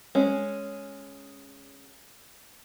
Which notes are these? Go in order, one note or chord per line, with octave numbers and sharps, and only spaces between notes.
G#3 C#4